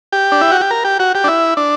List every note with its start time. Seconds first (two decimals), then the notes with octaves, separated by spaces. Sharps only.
0.12 G4
0.32 D4
0.41 E4
0.52 F#4
0.61 G4
0.71 A#4
0.85 G4
0.99 F#4
1.15 G4
1.24 D4
1.28 E4
1.57 D4